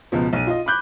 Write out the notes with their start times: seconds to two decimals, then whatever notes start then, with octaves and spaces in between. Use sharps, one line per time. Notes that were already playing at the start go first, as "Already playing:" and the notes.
0.12 C#2 B2 F3
0.33 B1 D#7
0.47 F4 D#5
0.66 B5 D6 F#6 G6